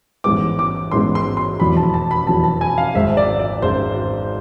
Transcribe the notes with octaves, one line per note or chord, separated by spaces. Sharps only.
A1 G#2 G#3 B3 D6
D6
A1 G#2 G#3 B3 C6
C6
C6
F1 E2 B2 B5
A5
A5
B5
F1 E2 B2 A5
A5
G#5
F5
G#1 G#2 G#3 E5
D5
D5
G#1 G#2 G#3 C5